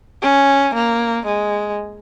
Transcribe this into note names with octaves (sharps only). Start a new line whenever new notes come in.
C#4
A#3
G#3